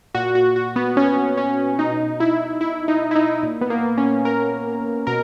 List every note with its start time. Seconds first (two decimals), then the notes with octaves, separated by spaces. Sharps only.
0.14 A#2 F#4
0.35 F#4
0.56 F#4
0.76 B3
0.97 C#4
1.37 C#4
1.79 B2 D#4
2.20 E4
2.61 E4
2.88 D#4
3.11 E4
3.15 D#4
3.43 A#2
3.61 B3
3.70 A#3
3.98 C#4
4.25 A#4
5.07 B2 A#4